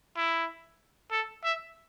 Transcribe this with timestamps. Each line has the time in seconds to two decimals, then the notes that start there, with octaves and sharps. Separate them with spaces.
0.17 E4
1.12 A4
1.44 E5